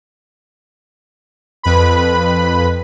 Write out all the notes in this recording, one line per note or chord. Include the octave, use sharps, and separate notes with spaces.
F2 B4 B5